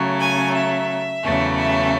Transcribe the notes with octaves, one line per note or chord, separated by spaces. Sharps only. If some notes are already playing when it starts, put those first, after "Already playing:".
Already playing: C#3 F#3 A3
G#5
E5
E2 C#3 F#3 A3
E5